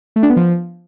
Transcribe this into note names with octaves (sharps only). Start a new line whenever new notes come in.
A3
D4
B3
F3